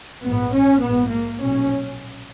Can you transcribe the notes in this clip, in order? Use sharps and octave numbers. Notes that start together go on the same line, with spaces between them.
A#1 G#2 B3
C#4
A#1 G#2 B3
A#3
B1 A#2 C#4